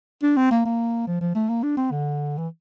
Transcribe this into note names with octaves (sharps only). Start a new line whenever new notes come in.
D4
C4
A#3
A#3
F3
F3
A3
A#3
D4
C4
D3
E3